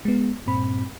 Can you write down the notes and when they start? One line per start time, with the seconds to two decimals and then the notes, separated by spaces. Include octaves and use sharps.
0.05 G#3 B3
0.46 G2 A#2 C4 B5